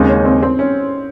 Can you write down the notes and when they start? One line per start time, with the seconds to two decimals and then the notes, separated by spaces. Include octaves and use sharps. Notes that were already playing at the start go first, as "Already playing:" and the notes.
Already playing: D#2 C#3 G#3 C4 D#4
0.08 C#4
0.25 C4
0.43 C4
0.59 C#4